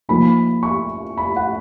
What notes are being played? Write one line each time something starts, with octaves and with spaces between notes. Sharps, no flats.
F3 A#3 D#4 B5
C#6
B5
F#5